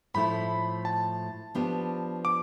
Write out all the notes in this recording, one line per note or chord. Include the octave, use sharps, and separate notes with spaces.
A2 F3 A3 E4 B5
A5
F3 B3 D4 G4
D6